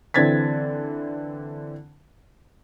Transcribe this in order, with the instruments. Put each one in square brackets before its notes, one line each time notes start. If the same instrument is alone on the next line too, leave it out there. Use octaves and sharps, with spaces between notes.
[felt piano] D3 E3 C4 G#6 A6 B6